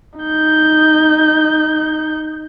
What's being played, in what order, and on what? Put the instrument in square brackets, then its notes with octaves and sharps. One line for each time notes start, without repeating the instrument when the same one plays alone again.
[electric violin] D#4 G6